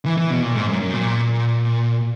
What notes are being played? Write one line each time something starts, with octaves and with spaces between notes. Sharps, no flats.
E3
E3
B2
A#2
G#2
F#2
F#2
A#2